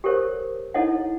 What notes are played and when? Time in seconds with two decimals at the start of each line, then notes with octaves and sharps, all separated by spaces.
0.04 G4 A4 A#4 C5 C#5
0.74 D#4 E4 A4 C#5 D#5 F#5